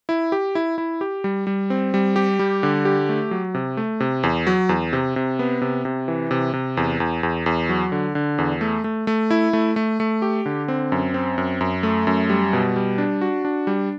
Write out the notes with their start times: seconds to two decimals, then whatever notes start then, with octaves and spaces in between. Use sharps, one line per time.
0.09 E4
0.32 G4
0.55 E4
0.78 E4
1.01 G4
1.24 G3
1.47 G3
1.70 C4
1.94 G3
2.16 G4
2.39 G3
2.63 D3
2.85 G4
3.09 A3
3.31 F#3
3.54 C3
3.77 A3
4.00 C3
4.23 E2
4.47 F#3
4.69 E2
4.93 C3
5.16 C3
5.39 B3
5.62 C3
5.85 C3
6.08 E3
6.31 C3
6.53 C3
6.77 E2
7.00 E2
7.23 E2
7.46 E2
7.69 F#3
7.92 D3
8.15 D3
8.38 E2
8.61 A3
8.84 A3
9.07 A3
9.31 E4
9.53 A3
9.76 A3
10.00 A3
10.22 G4
10.46 D3
10.68 C4
10.92 F#2
11.14 C4
11.38 F#2
11.61 F#2
11.83 A3
12.07 F#2
12.30 G3
12.53 B2
12.76 G3
12.98 D4
13.21 F#4
13.45 D4
13.67 G3